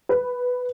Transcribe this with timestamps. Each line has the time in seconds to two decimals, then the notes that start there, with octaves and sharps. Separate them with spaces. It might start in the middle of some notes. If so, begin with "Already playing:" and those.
0.09 B4